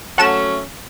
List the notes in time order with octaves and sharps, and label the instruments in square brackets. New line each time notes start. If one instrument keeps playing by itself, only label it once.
[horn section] F#3 A3 C#4 [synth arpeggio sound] F#5 A5 E7